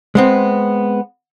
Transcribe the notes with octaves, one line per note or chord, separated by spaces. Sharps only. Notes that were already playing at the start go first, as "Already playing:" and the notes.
G#3 B3 C4